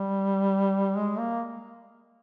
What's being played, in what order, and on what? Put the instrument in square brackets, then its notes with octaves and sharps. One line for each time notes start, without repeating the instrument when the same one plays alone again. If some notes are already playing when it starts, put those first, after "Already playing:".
Already playing: [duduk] G3
G#3
A#3